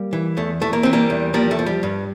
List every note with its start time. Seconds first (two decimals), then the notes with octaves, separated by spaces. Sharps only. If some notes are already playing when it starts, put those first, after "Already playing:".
Already playing: G3 A#3
0.13 E3
0.37 E2 A3
0.61 E3 A3
0.73 A#3
0.83 E3 C4
0.93 G3 A#3
1.10 E2
1.34 F3 G3 A#3
1.51 A3
1.59 F3
1.66 G3
1.83 G2